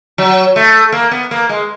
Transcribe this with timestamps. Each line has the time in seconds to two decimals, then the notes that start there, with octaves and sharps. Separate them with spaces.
0.18 F#3
0.56 A3
0.92 A#3
1.11 B3
1.31 A#3
1.49 G#3